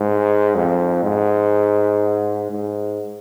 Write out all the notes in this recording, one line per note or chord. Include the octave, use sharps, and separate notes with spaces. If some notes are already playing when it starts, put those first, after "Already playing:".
Already playing: G#2
F2
G#2
G#2